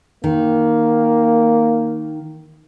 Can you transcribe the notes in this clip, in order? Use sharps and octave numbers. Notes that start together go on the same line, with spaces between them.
D#3 A#3